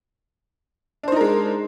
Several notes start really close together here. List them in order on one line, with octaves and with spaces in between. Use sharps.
D4 C5 D#4 A#4 G#3